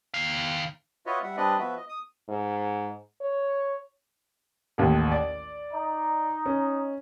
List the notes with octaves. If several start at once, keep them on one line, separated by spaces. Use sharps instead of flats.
D#3 F5
F4 F#4 B4 C#5 D#5 E5
G3 E5 F#5
G3 C4 D4 B4 D5 D#5
F3 B3 F#4 B4 E5
D#5
D#6
G#2
C#5
A1 D#2
D5
D#4
C#4